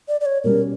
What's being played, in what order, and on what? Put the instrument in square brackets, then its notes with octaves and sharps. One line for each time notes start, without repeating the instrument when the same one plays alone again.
[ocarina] D5
D5
C#5
[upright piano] B2 G3 C#4 [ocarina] A#4